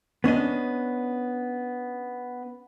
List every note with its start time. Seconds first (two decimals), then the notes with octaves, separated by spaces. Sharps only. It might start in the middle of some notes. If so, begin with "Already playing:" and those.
0.24 B3 C#4 D4 D#5